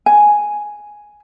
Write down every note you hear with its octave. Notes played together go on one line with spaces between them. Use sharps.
G#5